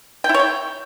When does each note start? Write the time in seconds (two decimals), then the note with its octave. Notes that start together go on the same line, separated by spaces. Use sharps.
0.24 G5
0.29 E4
0.34 C#5
0.39 G5